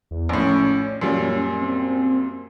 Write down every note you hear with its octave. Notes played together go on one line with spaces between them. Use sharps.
E2
A#1 A2 C#4
F#2 A#2 G3
C4